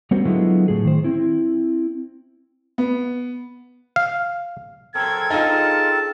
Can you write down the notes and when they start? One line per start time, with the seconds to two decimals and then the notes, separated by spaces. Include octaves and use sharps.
0.11 G3 B3 C#4 F#4 A#4 C5
0.25 D3 F#3 G#3 B3 E4 F4
0.68 A2 G#4
0.85 D#3 C5
1.04 C4 E4
2.78 B3
3.96 F5
4.95 A#2 C#3 F#3 C4 A4 A#4 G#6
5.30 D4 D#4 F4 G#4 D#5 A5